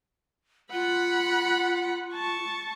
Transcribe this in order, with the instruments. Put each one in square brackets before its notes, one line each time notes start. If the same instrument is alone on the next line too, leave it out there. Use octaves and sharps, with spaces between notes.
[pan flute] F4 [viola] F#5 B5
[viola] A5 C#6